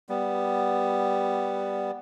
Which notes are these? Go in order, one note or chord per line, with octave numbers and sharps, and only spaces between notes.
G3 B3